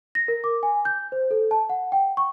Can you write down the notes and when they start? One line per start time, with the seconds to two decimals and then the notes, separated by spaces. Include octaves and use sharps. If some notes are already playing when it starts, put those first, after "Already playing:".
0.15 A#6
0.28 A#4
0.44 D6
0.63 G#5
0.85 G6
1.12 C5
1.31 A4
1.51 A5
1.69 F#5
1.92 G5
2.17 C#6